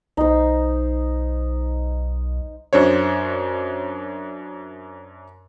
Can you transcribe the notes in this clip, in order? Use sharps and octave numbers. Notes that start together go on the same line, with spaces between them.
B1 D#4 C5
F#2 D4 C5 C#5